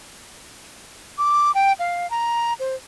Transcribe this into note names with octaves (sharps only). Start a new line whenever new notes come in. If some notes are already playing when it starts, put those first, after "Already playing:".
D6
G5
F5
A#5
C5